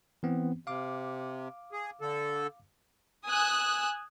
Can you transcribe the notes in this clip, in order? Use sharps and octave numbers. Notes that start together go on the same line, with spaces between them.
E3 B3 C4
C3 F5 D6
G#4
D3 A4
G#5 D#6 E6 F#6